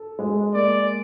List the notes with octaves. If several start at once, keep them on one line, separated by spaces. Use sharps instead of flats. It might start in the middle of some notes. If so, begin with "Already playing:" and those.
Already playing: A4
G#3
A#3 D5